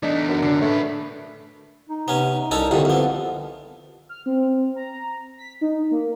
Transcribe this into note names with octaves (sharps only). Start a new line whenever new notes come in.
E2 A3 D4 D#4
F#2
D3 D4
A2 A3 B4
D#4
C3 B3 C#4
D#4
C2 C#4 D#4 A4
C2 A#2 D3 D#3
F2 B3
F6
C4
A#5
B6
D#4
A#3